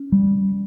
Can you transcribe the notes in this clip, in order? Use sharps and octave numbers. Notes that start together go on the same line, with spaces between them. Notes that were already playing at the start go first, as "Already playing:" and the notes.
Already playing: C#4
G3